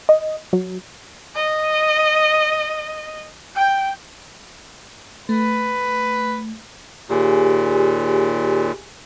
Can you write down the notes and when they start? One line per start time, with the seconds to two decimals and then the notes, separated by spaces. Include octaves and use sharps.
0.09 D#5
0.53 F#3
1.36 D#5
3.56 G5
5.29 A3 B4
7.09 D#2 A#2 G4 G#4 G#5